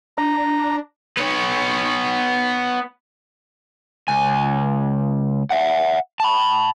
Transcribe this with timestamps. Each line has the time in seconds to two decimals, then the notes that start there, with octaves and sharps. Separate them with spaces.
0.18 D4 A#5
1.17 B3 C#5
4.08 C#2 G#5
5.50 E5 F#5
6.20 A5 B5